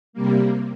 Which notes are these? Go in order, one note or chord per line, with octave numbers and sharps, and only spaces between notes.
C3 G3 A#3